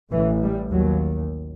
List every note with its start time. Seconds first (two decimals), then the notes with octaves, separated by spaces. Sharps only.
0.12 A1 A2 E3
0.42 G3
0.71 D#2 F#3